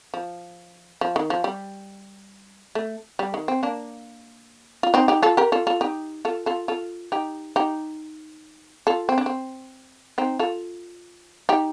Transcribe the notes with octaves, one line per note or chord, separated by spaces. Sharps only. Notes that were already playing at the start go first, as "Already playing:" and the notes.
F3
F3
D#3
F3
G3
A3
G3
D#3
C4
A#3 D4
F4
C4 D#4
D#4 G4
F4 A4
G4 A#4
F4 A4
F4 A4
D#4 G4
F4 A4
F4 A4
F4 A4
D#4 G4
D#4 G4
F4 A4
C4
D4
C4
C4 D#4
F4 A4
D#4 G4